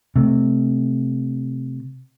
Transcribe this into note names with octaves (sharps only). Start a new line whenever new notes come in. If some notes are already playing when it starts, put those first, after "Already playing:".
C3 A3